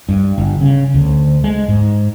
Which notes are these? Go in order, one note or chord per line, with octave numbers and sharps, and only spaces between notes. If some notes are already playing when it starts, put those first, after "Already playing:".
G2
G1
C#3
D2
G#3
G#2